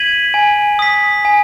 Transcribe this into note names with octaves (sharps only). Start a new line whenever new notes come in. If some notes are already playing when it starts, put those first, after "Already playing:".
Already playing: G#6 B6 D#7 F#7
G#5
D#6 B6
G#5